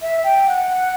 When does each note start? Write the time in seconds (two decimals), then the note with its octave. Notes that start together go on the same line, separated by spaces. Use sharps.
0.02 E5
0.24 G5
0.47 F#5